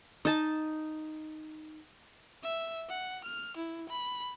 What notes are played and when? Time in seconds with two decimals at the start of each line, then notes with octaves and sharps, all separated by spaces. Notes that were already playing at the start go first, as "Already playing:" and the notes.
0.25 D#4 A5
2.43 E5
2.89 F#5
3.24 F6
3.57 E4
3.89 B5